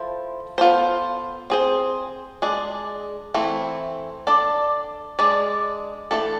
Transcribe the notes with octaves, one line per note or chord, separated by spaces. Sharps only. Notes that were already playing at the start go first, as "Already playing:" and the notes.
Already playing: F3 E4 A4 C5
B3 F4 A4 C5
C4 G#4 C5
G#3 D4 G#4
E3 A3 C4 E4
D4 A4 D5
G#3 D4 G#4 D5
E3 A3 D4 A4